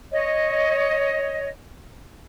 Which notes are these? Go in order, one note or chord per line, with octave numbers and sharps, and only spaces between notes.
C#5 D#5